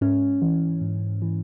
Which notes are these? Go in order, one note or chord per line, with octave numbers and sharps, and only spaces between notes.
G#2 C#4
E3
G#2
E3